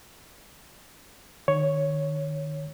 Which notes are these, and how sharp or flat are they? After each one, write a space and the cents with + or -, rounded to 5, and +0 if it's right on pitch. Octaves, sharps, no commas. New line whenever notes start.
D#3 -30 C#5 +0